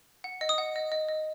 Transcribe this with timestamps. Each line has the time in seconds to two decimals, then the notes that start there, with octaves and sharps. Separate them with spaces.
0.24 F#5
0.41 D#5
0.49 D#6
0.58 F#5
0.76 D#5
0.92 D#5
1.09 D#5